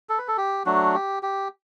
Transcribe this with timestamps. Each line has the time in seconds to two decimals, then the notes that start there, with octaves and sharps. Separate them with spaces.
0.09 A4
0.18 B4
0.28 A4
0.37 G4
0.66 F#3 A3 D4 F#4
0.95 G4
1.23 G4